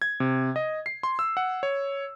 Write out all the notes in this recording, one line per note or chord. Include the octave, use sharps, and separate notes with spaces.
G#6
C3
D#5
C7
C6
E6
F#5
C#5